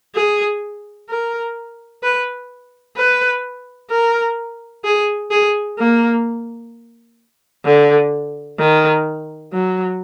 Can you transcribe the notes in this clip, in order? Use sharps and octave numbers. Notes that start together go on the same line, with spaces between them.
G#4
A#4
B4
B4
A#4
G#4
G#4
A#3
D3
D#3
F#3